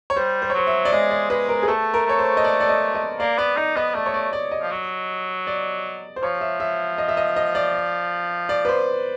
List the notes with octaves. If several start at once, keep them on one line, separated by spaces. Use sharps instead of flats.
C#5
G3 C5
C5
C#5
F#3 C5
E5
D5
G#3 D#5
D5
G#3 B4
A#4
G#4
A3 A4
A#4
A3 C#5
C5
D#5
D5
D5
D#5
D#5
A#3 D5
B3 D5
D#4 D#5
B3 D#5
A3 D5
C#5
D5
D5
D#5
F3
F#3
D5
C5
F3 C#5
E5
E5
D#5
E5
D#5
D#5
D5
D5
B4
C5